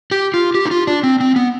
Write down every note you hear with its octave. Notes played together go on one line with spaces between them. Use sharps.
G4
F4
G4
D#4
F4
D4
C4
C4
B3